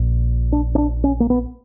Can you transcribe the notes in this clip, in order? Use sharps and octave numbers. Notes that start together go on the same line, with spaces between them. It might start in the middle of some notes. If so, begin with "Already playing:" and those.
Already playing: A#1 A#2
D4
C#4
D4
C#4
A#3
B3